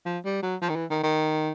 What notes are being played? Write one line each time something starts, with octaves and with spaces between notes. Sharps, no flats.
F3
G3
F#3
F3
D#3
E3
D#3
D#3